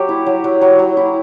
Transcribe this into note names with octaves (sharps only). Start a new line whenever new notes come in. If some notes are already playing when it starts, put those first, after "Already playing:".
Already playing: F#3 G4
E4
F#3
F#3
F#3
F#3
E4